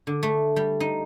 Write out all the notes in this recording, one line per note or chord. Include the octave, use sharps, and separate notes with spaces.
D3
A3
G3
D#4